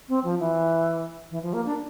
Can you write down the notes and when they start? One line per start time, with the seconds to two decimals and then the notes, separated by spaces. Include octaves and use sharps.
0.09 C4
0.24 F3
0.40 E3
1.31 E3
1.43 F3
1.53 A#3
1.66 D4